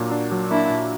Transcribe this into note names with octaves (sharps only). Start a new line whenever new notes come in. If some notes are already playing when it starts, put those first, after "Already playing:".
Already playing: A#2 F#3 A#3 D4
D4
F#3
A#3 D4 E4
A#2